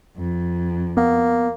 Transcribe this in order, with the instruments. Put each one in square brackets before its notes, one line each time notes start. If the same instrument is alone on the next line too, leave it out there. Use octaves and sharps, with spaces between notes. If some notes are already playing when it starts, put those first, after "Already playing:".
[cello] F2
[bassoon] A#3 [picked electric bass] B3